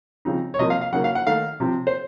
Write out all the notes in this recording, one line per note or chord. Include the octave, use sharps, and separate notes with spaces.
C#3 F3 C4 D#4
C#5
C3 F3 A#3 F4 D#5
F5
F5
C#3 F#3 A#3 D#4 F#5
F5
F#5
D#3 A3 D#4 F5
C3 F3 C4
C5